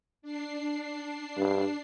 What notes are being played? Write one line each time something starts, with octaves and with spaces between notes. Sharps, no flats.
D4 C7
G2